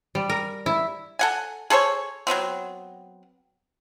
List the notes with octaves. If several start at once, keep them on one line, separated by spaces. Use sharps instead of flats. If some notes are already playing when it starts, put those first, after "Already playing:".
G3
A#4
E4
A4 F#5 G#5
G#4 A4 C5 C#5
F#3 G3 B3 C4